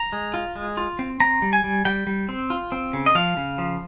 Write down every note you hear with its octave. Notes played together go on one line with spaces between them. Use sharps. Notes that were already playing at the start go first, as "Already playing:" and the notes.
Already playing: A#5
G#3
F4
G#3
F4
C4
C4 A#5
G3
G#5
G3
G3 G5
G3
C4
F4
C4
C#3
D#5
F3 F5
C#3
F3